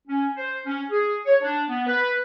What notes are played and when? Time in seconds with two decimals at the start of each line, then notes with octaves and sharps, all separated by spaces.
0.08 C#4
0.37 C5
0.66 C#4
0.91 G#4
1.26 C#5
1.42 D4
1.69 B3
1.87 B4